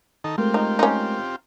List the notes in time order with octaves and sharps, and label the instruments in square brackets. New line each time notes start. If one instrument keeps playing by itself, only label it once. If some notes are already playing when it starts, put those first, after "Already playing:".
[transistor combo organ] D#3 D#4 A4
[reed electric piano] G#3 A3 A#4 [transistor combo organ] C4 F4 G4
[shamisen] D#4
C#4 D#4